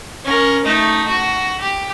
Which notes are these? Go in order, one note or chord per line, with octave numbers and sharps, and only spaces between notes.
C#4 A#4
A3 D#4
F#4
G4